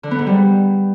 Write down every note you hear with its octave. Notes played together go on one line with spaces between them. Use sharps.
D3
B3
G#2
G3